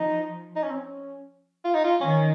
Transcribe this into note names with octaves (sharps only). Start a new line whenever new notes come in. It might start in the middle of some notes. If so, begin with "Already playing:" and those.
Already playing: F3 D#4
D#4
C#4
C4
C#4
F4
D#4
F4
D#3 C#4